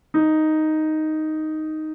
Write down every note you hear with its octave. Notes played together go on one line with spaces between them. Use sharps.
D#4